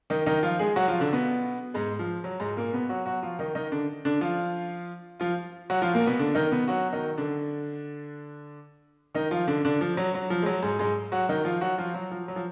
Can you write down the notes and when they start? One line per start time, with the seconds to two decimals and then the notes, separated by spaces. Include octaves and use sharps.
0.10 D#3 D#4
0.26 D#3 D#4
0.43 F3 F4
0.59 G#3 G#4
0.76 F#3 F#4
0.88 F3 F4
1.00 D3 D4
1.13 B2 B3
1.74 G#2 G#3
1.99 F3
2.24 F#3
2.40 G#2 G#3
2.57 A#2 A#3
2.73 B2 B3
2.89 F#3 F#4
3.06 F#3 F#4
3.22 F3 F4
3.39 D#3 D#4
3.55 D#3 D#4
3.72 D3 D4
4.05 D3 D4
4.21 F3 F4
5.20 F3 F4
5.70 F#3 F#4
5.82 F3 F4
5.94 A#2 A#3
6.06 B2 B3
6.19 D3 D4
6.35 D#3 D#4
6.52 B2 B3
6.68 F#3 F#4
6.93 D#3 D#4
7.18 D3 D4
9.14 D#3 D#4
9.31 F3 F4
9.47 D3 D4
9.65 D3 D4
9.81 F3
9.97 F#3
10.14 F#3
10.30 F3
10.42 G#3
10.46 F#3
10.63 G#2 G#3
10.79 G#2 G#3
11.12 F#3 F#4
11.29 D#3 D#4
11.45 F3 F4
11.61 F#3 F#4
11.78 F3 F4
11.94 F#3
12.11 F3
12.28 F#3
12.36 F3